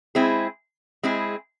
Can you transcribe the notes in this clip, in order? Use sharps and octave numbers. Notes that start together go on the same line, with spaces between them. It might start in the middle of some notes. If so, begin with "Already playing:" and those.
G#3 C4 E4 G#4
G#3 C4 E4 G#4